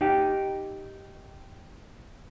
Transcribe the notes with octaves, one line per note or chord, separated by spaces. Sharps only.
D#4 G4